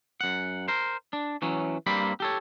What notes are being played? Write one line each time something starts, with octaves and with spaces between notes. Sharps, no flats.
F#2 F#5
A#4 C5
D4
E3 F#3 C#4
G2 G3 A#3 C4 B5
G4 A4 C#5